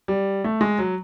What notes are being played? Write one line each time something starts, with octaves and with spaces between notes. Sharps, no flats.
G3
A3
G#3
F#3